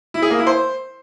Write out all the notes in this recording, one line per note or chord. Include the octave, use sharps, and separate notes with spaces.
E4
G#4
A#3
E4
C5